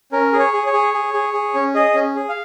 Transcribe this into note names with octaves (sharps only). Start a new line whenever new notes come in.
C#4 A#4
G#4
C#5
G#4
C#5
G#4
G#4
G#4
G#4
C#4
G#4 D#5
C#4
G#4
F5